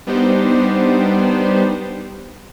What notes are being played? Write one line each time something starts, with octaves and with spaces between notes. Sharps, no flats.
G3 B3 D4 D#4 G4 C5